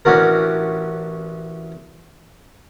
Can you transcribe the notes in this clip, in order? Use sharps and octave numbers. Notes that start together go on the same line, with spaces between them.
A1 C#4 D4 F#4 A#4